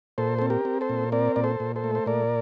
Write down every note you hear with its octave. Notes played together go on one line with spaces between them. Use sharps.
A#2 A4 C5
C4 A4
G4 A#4
C4
A4 C5
A#2
C4 A#4 D5
A#2 D5
A4 C5
A#2
A4 C5
A3
C5
A#2 A#4 D5